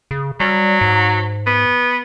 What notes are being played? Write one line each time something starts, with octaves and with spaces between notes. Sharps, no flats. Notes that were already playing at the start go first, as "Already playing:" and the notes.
C#3
F#3 G3
G#2
B3